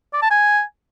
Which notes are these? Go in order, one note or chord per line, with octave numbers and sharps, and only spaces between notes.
D5
A5
G#5